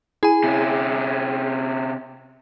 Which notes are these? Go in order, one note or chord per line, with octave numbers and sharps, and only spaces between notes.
E4 G#4 G#5
C3 C#4